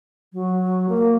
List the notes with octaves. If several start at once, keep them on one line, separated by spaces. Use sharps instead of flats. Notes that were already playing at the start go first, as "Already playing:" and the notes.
F#3
A#3